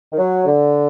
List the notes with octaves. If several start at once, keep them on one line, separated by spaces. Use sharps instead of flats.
D#3
F#3
D3